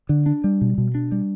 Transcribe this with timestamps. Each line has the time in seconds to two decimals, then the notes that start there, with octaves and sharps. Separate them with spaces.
0.09 D3
0.26 D4
0.44 G3
0.61 B2
0.78 B2
0.95 D4
1.12 G3